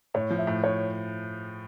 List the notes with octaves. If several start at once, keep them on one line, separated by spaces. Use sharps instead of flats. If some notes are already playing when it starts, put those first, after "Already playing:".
A2 C#5
F3
E5
A2
A2 C#5